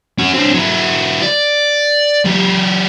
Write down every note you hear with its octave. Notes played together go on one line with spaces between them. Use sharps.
C#4 F#4
C4 D4
F#3 E4
D5
F#3 G4